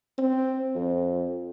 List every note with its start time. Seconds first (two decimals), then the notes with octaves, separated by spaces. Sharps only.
0.18 C4
0.76 F2